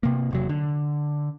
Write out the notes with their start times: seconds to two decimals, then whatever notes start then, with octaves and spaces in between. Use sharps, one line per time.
0.03 C3 A#3
0.31 E1 C3 F#3
0.49 D3